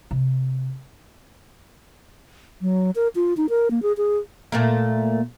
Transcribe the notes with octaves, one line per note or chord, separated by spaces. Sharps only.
C3
F#3
A#4
F4
D#4
A#4
A#3
G#4
G#4
A#2 A3 A#3